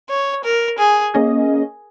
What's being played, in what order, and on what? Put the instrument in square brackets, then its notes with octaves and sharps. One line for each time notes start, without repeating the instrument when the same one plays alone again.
[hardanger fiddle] C#5
A#4
G#4
[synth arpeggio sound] A#3 C#4 G#4 D#5